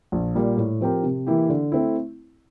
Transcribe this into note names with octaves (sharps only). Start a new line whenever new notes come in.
A#1
A#2 G3 A#3
A2
F3 C4 G4 A#4
C3
E3 A#3 E4 G4
D3
A3 C4 E4